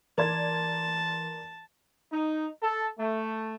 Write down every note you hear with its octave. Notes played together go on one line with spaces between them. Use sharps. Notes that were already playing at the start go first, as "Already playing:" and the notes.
E3 A#4 D5 A5 C6 G#6
D#4
A4
A3